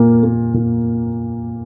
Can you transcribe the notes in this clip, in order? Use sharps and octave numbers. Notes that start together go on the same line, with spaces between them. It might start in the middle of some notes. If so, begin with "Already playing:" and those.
Already playing: A#2 A#3
A#3
A#2